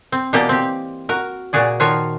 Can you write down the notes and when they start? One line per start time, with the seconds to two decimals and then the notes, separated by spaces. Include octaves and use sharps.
0.12 C4
0.33 B2 E3 A#3 G4 D5 D#5
0.49 C4 G4
1.09 F#4 A#4
1.53 A#2 F#4 G#4 D5
1.80 D#3 F3 F4 F#4 C#5